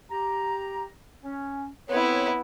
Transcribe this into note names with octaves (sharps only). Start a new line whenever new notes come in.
G4 A#5
C#4
B3 C4 E4 A4 C#5